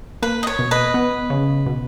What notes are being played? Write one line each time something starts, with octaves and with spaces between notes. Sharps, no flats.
A#3 B4
D#5
C#5
B2
B4 D#5
B3
C#3
B2